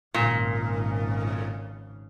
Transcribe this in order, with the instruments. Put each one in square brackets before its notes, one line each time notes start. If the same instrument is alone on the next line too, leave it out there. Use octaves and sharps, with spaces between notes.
[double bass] G#1 C#3 [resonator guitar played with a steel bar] A#2